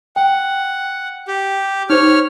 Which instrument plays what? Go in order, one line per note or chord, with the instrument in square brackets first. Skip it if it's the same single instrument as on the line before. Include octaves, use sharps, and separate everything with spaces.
[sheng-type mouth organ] F#5 [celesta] G5
[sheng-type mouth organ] G4
[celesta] D#4 C5 [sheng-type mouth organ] C#5 F6